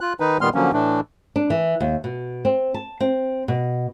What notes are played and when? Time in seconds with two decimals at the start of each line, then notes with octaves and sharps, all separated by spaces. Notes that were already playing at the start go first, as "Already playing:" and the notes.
0.01 F4 F#6
0.20 D#3 D#4 B4
0.41 A#2 D#3 G3 B3 C6 F6
0.54 D3 F3 F#3 A#3 C#4
0.73 A2 E3 A3 D4
1.36 D4
1.50 E3
1.80 D#2
2.04 B2
2.45 C4
2.74 A5
3.00 C4
3.48 B2